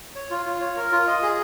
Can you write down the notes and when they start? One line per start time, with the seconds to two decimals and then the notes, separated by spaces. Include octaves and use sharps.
0.15 C#5
0.30 F4
0.46 F4
0.61 C#5
0.77 A#4
0.92 F4
1.07 D#5
1.22 G#4